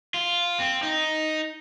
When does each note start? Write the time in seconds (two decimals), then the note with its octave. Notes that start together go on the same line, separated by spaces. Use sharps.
0.14 F4
0.60 C4
0.83 D#4